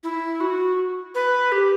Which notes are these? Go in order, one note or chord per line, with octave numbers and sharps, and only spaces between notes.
E4
F#4
B4
G4